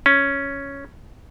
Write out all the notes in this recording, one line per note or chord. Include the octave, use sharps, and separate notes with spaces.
C#4